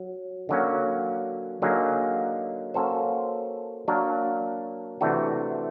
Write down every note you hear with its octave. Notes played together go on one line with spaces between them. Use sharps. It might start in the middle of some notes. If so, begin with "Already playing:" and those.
Already playing: F#3
D3 F#3 A#3 C#4 F#4
D3 F#3 A#3 D#4 G#4
A#3 C#4 F#4 A4 C5
F#3 A#3 D4 F#4 A#4
C3 E3 A3 D4 F#4